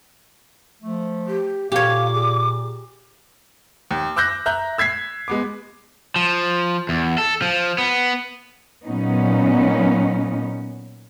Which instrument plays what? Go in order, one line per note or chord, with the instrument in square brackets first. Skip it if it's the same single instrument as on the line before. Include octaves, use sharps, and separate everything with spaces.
[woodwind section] F3 A3
[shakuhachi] G4
[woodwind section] A#2 [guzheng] G4 C#5 [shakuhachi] F5 [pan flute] D6
[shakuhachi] G#4
[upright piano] D#2
D6 E6 F#6 G6 A#6
E5 A#5 F#6 G6
E6 G#6 B6 C7
G#3 B3 D6
[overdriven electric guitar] F3
E2
A4
F3
B3
[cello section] A#2 F#3 B3 C#4 D#4